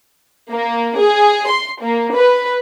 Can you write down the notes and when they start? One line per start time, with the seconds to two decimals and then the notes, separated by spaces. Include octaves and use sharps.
0.51 A#3
0.99 G#4
1.48 C6
1.82 A#3
2.15 B4